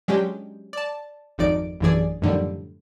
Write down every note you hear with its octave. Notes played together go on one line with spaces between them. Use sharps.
F#3 G#3 C#4 D4 G4
D5 A5
G#1 F2 D#4 D5 D7
A1 F#2 D3 E3 G#4 D5
F#2 A2 D3 D#3 F3 G3